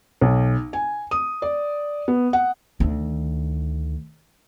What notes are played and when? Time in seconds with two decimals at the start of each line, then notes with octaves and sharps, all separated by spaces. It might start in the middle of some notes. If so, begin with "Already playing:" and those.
0.21 B1
0.73 G#5
1.11 D#6
1.42 D5
2.08 B3
2.33 F#5
2.80 D2 D#3